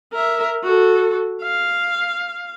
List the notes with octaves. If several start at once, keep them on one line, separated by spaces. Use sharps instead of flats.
A#4 E5
F#4 A4
F5